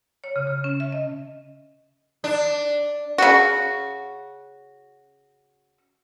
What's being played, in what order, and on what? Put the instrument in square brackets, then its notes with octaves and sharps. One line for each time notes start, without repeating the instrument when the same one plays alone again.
[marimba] C#5
C#3
C#3
C#4
E5
D#5
[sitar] D4
[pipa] C#3 F#4